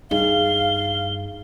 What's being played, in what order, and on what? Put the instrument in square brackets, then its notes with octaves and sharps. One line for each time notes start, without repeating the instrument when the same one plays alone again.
[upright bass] G2 [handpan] D#4 G#4 [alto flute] F5 [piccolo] G7